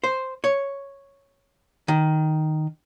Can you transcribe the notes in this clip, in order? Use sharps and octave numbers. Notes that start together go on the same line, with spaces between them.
C5
C#5
D#3